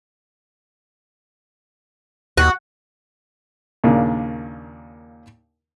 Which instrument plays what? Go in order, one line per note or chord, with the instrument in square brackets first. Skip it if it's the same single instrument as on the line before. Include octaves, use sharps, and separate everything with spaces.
[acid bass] D#2 [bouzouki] F#4
[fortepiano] D#2 A#2 C#3 A#3 D4